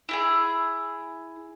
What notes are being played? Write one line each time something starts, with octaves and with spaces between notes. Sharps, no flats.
E4 G4 G#4